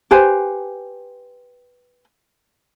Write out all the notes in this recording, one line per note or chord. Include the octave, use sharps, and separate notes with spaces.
G4 B4 C5 G#5